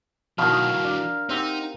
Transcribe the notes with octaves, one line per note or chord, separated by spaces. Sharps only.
B2 D#3 E3 F#3 A#4 F5
D4
C4 D#4 G4 F#5